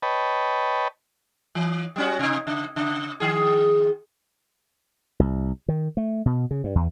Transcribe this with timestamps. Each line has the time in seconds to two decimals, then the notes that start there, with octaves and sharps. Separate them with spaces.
0.03 B4 C#5 D#5 G5 A5 B5
1.55 E3
1.96 G3 C#4 F#4
2.19 C3 D#4
2.47 C#3
2.76 C#3
3.20 D#3 G#4
5.20 C2
5.68 D#3
5.97 A3
6.26 B2
6.51 C#3
6.64 G2
6.75 E2